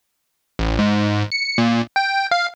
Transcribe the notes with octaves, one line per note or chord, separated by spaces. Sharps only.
A1
G#2
C#7
A#2
G5
F5